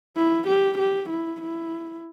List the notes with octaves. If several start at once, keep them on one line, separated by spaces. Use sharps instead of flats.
E4
G4
G4
E4
E4